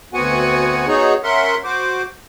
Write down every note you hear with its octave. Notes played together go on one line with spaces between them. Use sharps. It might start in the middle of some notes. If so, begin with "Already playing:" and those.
D2 B3 C4 F#4 F#5 G#5
B3 D#4 F#4 G#4 C#5
C#4 A#4 E5 F#5 C6
F#4 C5 D6